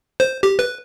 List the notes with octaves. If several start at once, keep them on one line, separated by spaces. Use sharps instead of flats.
C5
G4
B4